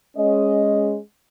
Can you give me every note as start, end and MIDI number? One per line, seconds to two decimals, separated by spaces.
0.17 0.96 56
0.17 0.96 61
0.17 0.96 75